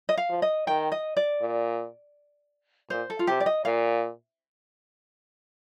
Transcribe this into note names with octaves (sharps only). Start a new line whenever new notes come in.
D#5
F5
F3
D#5
D#3 G5
D#5
D5
A#2
A#2 C5
A4
F4
C3 G4
D5
D#5
A#2 F5